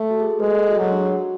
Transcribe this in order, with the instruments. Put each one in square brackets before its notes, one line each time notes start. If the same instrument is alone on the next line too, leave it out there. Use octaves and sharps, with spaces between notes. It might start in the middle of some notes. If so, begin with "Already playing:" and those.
Already playing: [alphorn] A3
[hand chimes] F#4
G#4
A4
[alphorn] G#3 [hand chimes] B4
[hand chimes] A4
G#4
F#4
[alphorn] F#3 [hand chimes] G#4
[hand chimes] D4
F#4